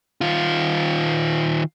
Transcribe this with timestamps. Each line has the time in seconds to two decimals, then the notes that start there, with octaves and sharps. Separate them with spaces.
0.21 D#3 F4